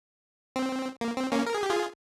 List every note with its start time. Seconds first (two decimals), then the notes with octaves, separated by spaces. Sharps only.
0.56 C4
1.01 A#3
1.17 C4
1.32 A#3 C#4
1.46 A#4
1.55 G#4
1.63 G4
1.70 F4 G#4